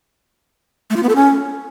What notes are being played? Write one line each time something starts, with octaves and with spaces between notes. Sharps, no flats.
A3
F4
B3
A4
C#4